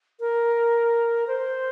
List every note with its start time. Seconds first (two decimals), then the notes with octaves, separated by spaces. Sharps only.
0.20 A#4
1.27 C5